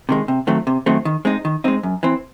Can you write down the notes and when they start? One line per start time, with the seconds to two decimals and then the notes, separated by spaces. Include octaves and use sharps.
0.09 C3 D#3 G#3
0.28 C3
0.47 D#3 F#3 A3 C4
0.67 C3
0.86 D#3 F#3 A3 C4
1.05 D#3
1.25 G#3 C4 D#4
1.45 D#3
1.64 G#3 C4 D#4
1.83 F#2
2.03 E3 C4